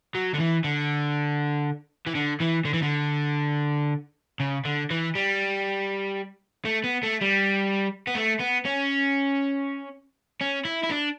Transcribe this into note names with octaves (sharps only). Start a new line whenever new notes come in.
F#3
D3
E3
D3
E3
D3
E3
D3
E3
D3
C#3
D3
E3
G3
A3
B3
A3
G3
B3
A3
B3
C#4
C#4
E4
E4
D4